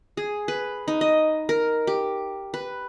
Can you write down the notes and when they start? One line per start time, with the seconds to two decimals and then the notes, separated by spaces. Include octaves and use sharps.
0.17 G#4
0.48 B4
0.88 D#4
1.01 D#5
1.49 A#4
1.87 G4
2.54 B4